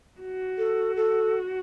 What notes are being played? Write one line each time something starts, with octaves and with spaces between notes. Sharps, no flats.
F#4
A4
A4